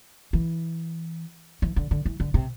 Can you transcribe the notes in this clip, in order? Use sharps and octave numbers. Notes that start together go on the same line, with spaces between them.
E3
E3
D3
D3
E3
D3
C3